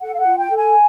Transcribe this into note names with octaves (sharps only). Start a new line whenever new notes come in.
A4 F#5
F5
F#5
F4
G5
A4
G#5